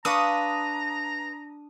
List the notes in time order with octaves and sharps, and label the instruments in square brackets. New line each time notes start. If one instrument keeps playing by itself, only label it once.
[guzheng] D4 [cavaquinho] B4 F5 C#6 [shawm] A#5 [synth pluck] D#6